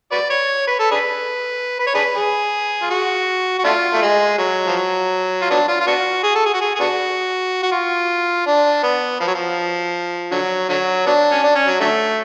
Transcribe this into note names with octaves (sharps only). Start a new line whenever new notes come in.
F#4 B4 D5
C#5
B4
A4
D4 G#4 B4
B4
C#5
D4 G#4 B4
G#4
F4
F#4
F#4
A3 D4 F4
A3
G#3
F#3
F3
F#3
F4
F#3 B3 D4
F4
F4
B3 D4 F#4
G#4
A4
G#4
F#4
G#4
G#4
B3 D4 F#4
F#4
F4
D4
B3
F3
F#3
F3
D3 F#3
D3 F#3
F#3 B3 D4
C#4
D4
C#4
F#3
D3 F#3 A3